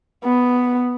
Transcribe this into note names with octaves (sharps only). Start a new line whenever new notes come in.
B3